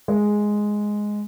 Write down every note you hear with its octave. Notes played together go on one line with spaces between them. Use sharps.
G#3